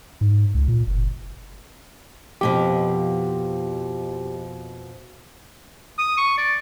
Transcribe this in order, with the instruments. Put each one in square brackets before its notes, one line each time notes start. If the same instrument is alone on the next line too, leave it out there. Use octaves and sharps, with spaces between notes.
[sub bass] G#2
C#2
A#2
F#1
[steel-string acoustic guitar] F2 B2 F3 [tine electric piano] G4
[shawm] D#6
C#6
D5